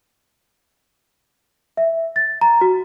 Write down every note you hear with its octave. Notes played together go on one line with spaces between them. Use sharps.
E5
A6
A#5
F#4